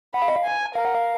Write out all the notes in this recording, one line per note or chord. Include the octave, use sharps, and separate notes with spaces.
F#5 B5
F5
D#5
F5
G#5
A#4 F5
F#5
F5